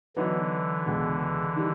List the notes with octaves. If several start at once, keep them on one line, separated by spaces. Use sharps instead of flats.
D3 E3 F#3 B3 D#4
C#2 B2 G#3
D#3 G3